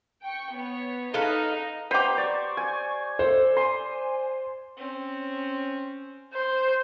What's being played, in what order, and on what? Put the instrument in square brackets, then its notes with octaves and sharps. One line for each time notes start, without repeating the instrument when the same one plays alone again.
[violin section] G5 C#6
B3 C#5
[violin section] D#4 [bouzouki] A4 B4 F5
[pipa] B3 G4 [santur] C5 [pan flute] A#5
[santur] D5 [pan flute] C#6
[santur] G#5
[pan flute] A4 [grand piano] C5
[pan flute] G#5 [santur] C6
[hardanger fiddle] C4 C#4
[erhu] C5